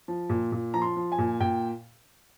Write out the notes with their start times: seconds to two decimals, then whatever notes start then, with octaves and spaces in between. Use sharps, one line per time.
0.08 F3
0.30 A#2
0.52 A#2
0.74 F3 A#5
0.82 C6
0.96 F3
1.12 G#5
1.18 A#2
1.40 A#2 G5